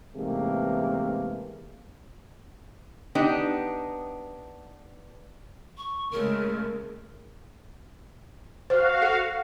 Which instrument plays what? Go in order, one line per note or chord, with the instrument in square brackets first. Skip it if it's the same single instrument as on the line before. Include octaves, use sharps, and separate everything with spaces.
[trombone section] E2 G#2 C3 E3 A3 A#3
[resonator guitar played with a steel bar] B3 D4 D#4 G4
[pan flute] C#6
[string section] C#3 G#3 A3 [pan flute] A#4
[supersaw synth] F#4 F5 [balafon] C5
[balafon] A4 F#5